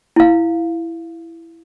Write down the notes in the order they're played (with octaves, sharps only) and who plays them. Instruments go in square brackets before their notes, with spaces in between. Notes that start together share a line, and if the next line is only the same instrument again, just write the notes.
[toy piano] E4 F5